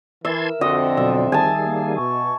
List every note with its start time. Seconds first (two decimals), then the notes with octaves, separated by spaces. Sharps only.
0.25 E3 A#4 E5 A5 C6 G#6
0.61 F2 D3 C4 F#4 D#5
0.97 B2 F#3 D5 E5
1.32 D#3 G3 G4 G#4 G#5 A5
1.64 A#3
1.96 B2 C#6